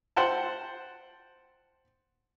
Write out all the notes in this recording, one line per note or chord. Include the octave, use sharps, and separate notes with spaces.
C5 F#5 G5 A5